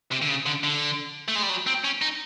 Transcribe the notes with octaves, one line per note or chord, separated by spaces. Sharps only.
C3
D3
C#3
D3
D3
A3
G#3
G3
F#3
C4
C#4
D#4